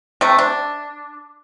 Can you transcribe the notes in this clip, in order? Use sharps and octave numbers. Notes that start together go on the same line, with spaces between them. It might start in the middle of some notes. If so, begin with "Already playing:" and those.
C3 A3
D4